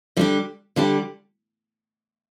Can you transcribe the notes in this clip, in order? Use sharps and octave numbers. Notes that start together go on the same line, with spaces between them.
D3 G3 D4 G4
D3 G3 D4 G4